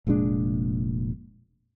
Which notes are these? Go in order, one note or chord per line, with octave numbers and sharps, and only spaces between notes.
F1 A#2 G#3 D4